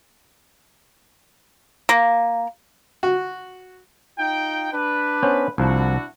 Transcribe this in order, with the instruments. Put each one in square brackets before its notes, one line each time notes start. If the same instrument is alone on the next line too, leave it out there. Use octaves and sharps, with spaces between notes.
[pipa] A#3
[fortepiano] F#4
[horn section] D#4 F4 G5
D4 B4
[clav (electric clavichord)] B3 C#4 C5
[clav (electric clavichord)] C2 F3 [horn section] D4 E4 F#4